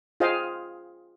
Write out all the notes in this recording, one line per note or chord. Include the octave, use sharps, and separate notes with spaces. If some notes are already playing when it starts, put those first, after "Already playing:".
F4 G#4 C5 D#5 F5 G5